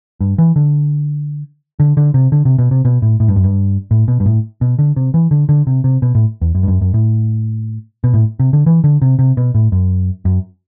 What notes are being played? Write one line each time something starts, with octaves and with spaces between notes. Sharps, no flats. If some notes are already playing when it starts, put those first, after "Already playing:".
G2
E3
D3
D3
D3
C3
D3
C3
B2
C3
B2
A2
A2
G2
F#2
G2
A2
B2
G2
A2
B2
D3
C3
E3
D3
D3
C3
C3
B2
A2
E2
F#2
G2
F#2
F#2
A2
B2
A2
C3
D3
E3
D3
C3
C3
B2
A2
F#2
F#2